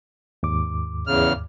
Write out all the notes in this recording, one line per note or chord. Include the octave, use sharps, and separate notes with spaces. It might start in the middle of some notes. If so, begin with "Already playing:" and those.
D#2 G#2 D6
E2 C#3 F6